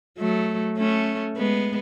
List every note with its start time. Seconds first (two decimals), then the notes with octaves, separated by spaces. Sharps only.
0.18 F#3 A3
0.77 A3 C#4
1.37 G#3 B3